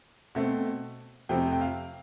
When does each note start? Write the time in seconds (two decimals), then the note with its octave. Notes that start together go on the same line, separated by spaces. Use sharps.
0.35 B2 A3 C4
1.29 F2 C3 F3 A3 C4 G5
1.53 G5
1.61 F5